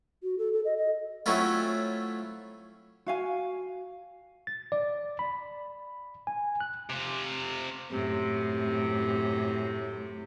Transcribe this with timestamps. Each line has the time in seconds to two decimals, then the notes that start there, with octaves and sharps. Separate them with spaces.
0.23 F#4
0.38 A4
0.53 A4
0.65 D#5
0.77 D#5
1.26 F#3 A3 C4 C#4 E4 F4
3.06 F#4 F5 G#5
4.47 A6
4.72 D5
5.19 B5
6.27 G#5
6.60 F#6
6.90 C3 F4
7.91 F#2 A2 C3